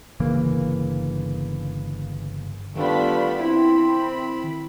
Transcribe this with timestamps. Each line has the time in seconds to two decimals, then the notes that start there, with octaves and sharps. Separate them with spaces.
0.20 G1 C#3 E3 A#3
2.76 D#3 G3 A3 B3 D4 F4 B5
3.39 C4 E4 B5